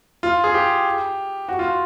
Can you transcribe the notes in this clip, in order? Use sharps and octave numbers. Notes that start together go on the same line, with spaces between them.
F4
G#4
G4
F#4
F4